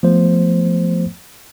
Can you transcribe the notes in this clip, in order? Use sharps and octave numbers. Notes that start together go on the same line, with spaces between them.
F3 A3 B3 C5